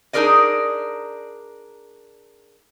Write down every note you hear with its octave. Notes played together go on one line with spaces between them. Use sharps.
D4 D#4 G#4 A#4 D5 D#5